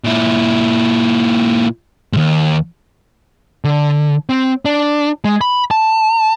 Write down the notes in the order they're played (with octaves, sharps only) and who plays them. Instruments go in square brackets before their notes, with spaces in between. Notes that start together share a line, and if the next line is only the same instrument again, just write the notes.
[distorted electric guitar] A#2 E4
D#2 G#2
[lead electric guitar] D3
C4
D4
G#3
B5
A5